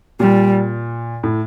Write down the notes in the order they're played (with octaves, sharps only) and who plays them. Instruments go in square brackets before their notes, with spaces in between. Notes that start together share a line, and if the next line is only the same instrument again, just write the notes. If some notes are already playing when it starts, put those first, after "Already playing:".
[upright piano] A#2 [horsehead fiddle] G3
[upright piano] A2